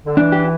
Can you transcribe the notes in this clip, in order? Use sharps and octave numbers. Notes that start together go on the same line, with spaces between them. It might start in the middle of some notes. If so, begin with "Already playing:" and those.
D3
E3 D4
G4